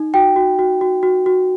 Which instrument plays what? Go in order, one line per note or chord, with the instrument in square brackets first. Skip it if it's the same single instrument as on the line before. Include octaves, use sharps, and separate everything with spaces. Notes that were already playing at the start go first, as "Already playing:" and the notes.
Already playing: [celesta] D#4
F#4 G5
F#4
F#4
F#4
F#4
F#4